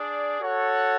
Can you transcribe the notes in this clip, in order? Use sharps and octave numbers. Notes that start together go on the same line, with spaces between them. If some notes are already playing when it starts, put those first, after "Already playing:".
Already playing: D4 G#4 D5
F#4 A4 C#5 F#5